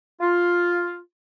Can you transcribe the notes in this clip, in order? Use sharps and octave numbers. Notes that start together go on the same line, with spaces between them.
F4